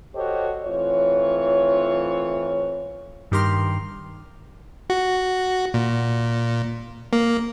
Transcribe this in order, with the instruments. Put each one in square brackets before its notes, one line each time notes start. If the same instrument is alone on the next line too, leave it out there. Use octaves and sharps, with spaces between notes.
[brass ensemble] F#4 G4 A4 C5 C#5 D#5
E3 A3 C4 F4 C#5
[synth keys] G2 D#3 G4 A#4 C6 F6
[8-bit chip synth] F#4
A#2
A#3